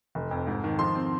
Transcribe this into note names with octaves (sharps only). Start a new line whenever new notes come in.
F1
F2
G#2
D#3
F3 C6
C4